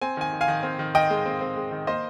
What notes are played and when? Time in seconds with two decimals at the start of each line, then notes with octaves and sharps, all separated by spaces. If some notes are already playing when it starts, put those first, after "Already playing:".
0.01 C4 G#5
0.17 D#3 G#5
0.32 D#3
0.41 F5 G#5
0.48 D#3
0.63 C4
0.79 D#3
0.95 D#3 D#5 G5
1.10 G#3
1.26 C4
1.41 C4
1.56 G#3
1.72 D#3
1.87 A#3 C5 D#5